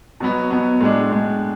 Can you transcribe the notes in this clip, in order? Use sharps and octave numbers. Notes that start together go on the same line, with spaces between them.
B2 F#3 B3
B2 F#3 B3
A2 G#3 D4
A2 G#3 D4